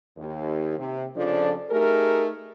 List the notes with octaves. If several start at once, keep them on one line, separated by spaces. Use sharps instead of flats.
D#2
C3
F2 C#3 F3 D4 A4 D5
A3 D#4 G4 G#4 A#4